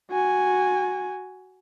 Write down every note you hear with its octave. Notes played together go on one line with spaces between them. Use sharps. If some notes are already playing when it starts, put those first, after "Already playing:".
F#4 G#5